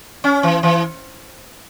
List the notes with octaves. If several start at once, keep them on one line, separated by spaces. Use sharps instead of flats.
C#4
E3
E3